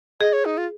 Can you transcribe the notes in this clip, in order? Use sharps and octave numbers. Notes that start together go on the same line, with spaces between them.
G#4 D#5
C#5
D#4
F4